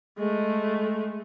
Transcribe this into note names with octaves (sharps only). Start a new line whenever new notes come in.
G#3 A3